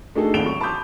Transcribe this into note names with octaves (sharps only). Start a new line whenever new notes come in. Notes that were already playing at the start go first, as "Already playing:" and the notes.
A3 D4 D#4 F#4 G#4 A4
G#1 C#2 D7 F7 G7
F#3 C#6
A5 B5 C6 D6 D#6 G6